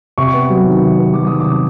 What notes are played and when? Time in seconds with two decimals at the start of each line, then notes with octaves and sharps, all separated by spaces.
0.18 C3 C#6
0.34 B3
0.49 F#3
0.66 D#3
0.82 C3
0.98 B3
1.14 F#3 D6
1.27 D#3 D#6
1.40 D6
1.46 C3